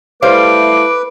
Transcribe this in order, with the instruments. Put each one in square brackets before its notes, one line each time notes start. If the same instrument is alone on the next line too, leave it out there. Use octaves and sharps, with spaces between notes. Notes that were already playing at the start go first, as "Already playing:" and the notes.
[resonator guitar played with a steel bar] G3 C5 F5 [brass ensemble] A3 E4 A4 [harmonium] B4 [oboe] D6